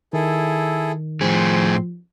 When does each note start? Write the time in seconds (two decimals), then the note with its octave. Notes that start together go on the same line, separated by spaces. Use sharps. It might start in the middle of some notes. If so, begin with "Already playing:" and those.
0.13 D#3 E4 G#4 A4
1.21 A2 F3 C4 G#4 C6